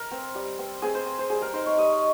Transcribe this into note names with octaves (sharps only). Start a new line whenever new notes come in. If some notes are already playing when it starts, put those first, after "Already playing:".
Already playing: A#4
C4
G3
C4
C4 G#4
C5
C4
C5
G3 G#4
A#4
D#4 C5
C#5
G3 D#5